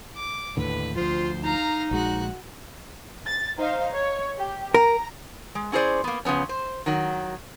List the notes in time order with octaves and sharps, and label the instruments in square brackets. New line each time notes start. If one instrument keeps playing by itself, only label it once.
[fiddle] D6
[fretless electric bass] D#2 A2 D3 [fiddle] B4
[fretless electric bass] D2 F3 [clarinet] F4 [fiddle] C5
[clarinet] D#4 [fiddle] F5 A#5
[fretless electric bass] A#1 G#3 [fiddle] F#4 F#6
[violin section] A6
D#4 C5 F5
C#5
G4
[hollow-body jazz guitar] A#4 [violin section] A#5
[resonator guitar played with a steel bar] G#3
C#4 E4 G#4 A#4 C5 D5
A#3 B3
C#3 F3 B3 C#4
C5
D#3 F#3